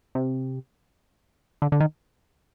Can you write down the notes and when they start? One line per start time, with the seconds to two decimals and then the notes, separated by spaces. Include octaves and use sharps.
0.15 C3
1.62 D3
1.72 D3
1.80 D#3